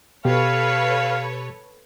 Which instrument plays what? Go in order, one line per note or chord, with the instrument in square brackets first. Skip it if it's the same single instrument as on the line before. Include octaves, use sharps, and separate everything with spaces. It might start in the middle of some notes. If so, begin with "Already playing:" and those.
[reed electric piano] B2 G4 [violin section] A4 B4 C#5 [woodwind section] F5